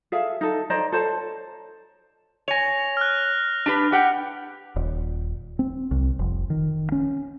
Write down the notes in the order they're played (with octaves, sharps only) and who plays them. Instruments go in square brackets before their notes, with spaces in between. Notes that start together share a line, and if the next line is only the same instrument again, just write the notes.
[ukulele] G#4 A4 E5 F5
D#4 A4
C5 D5 D#5 A#5
A4 C5 C#5 A5
[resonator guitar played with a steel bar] C#5 G#5 [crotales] A#6 F7
[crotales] F6 F#6
[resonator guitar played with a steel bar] D4 G4 B4
G4 F#5 G5
[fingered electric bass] D#1
C4
C2
F1
D#3
C#4